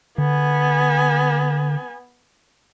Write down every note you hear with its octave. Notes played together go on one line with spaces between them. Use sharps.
D3 B3 G#5